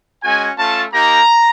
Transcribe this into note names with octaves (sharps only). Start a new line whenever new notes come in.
G#3 C#4 F#4 G#5
A3 C#4 F4 A5
A#3 D#4 G4 A#5